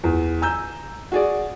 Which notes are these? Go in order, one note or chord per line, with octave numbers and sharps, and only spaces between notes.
E2
G#5 A#5 E6 G6
F#4 G#4 D5